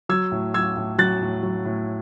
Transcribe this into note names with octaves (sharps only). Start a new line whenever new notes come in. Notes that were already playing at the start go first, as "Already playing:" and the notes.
F#3 E6 G#6
A2
F#3 E6 G#6
A2
F#3 F#6 A6
A2
F#3
A2